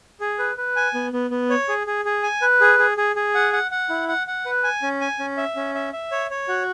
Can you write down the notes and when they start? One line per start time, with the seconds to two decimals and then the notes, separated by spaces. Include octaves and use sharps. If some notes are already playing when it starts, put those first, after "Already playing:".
0.20 G#4
0.39 B4
0.57 B4
0.76 G#5
0.94 B3
1.13 B3
1.31 B3
1.50 C#5
1.69 G#4
1.87 G#4
2.05 G#4
2.23 G#5
2.42 B4
2.61 G#4
2.79 G#4
2.98 G#4
3.16 G#4
3.35 F#5
3.53 F#5
3.71 F#5
3.90 E4
4.09 F#5
4.27 F#5
4.46 B4
4.64 G#5
4.82 C#4
5.01 G#5
5.19 C#4
5.38 E5
5.56 C#4
5.75 E5
5.93 E5
6.12 C#5
6.31 C#5
6.49 F#4